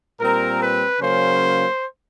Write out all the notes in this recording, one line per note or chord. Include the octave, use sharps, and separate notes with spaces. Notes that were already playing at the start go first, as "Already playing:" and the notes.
A#2 G3 C4 A#4
B4
C#3 F#3 A#3 C#4 C5